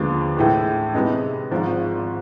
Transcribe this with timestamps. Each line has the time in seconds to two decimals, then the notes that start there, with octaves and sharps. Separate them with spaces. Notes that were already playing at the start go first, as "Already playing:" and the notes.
Already playing: D#2 D3 F3 G#3 B3
0.36 A2 E3 G#3
0.94 C3 E3 G#3 B3 D#4
1.51 G#1 G#2 F3